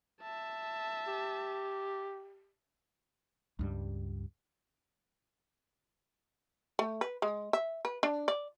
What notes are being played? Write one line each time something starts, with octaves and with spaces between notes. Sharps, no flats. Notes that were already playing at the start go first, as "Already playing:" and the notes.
E5 A5
G4
C#2 G2 G3
A3
B4
G#3
E5
B4
D4
D5